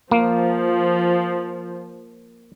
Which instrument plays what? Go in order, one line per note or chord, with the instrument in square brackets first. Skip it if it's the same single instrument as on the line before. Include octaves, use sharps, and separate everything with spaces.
[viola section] F3 [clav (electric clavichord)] A#3